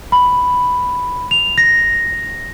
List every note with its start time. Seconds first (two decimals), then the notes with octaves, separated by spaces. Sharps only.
0.12 B5
1.31 F7
1.58 A#6